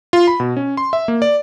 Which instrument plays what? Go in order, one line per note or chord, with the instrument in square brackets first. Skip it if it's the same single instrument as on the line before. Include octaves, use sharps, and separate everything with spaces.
[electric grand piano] F4
B5
B2
C#4
C6
E5
A#3
D5